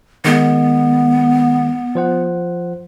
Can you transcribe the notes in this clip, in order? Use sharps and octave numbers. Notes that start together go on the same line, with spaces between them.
D#3 G#3 B3
F3 C5 F#5